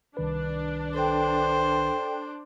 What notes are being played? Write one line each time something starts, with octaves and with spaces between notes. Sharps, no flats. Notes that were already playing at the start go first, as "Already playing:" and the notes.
C2 D#3 D4 B4
A4 C5 G5